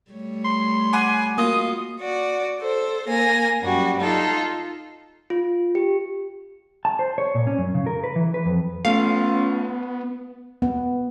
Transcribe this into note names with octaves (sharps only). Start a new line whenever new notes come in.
G3 A3 C#5
C6
F#5 G#5 B5 D6
A#3 F4 F#4 D#6
F#4 D5
A4 C5
A#3 G#5 A#6
F#2 G3 F#4
D#4 F4 A4
F4
G4
A5
C5
C#5
A#2
C#4
F#2
C#3
A#4
B4
E3
B4
F2
A3 B3 C#4 F4 F5
B3